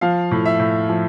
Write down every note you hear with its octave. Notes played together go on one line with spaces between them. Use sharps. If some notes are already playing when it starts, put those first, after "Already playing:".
F3 F5
A2
E5
A2
F3